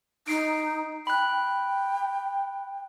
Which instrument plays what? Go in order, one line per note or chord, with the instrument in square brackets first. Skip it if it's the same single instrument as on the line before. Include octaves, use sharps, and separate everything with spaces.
[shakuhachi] D#4 [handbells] C7 D7
[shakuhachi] G5 [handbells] B5 F#6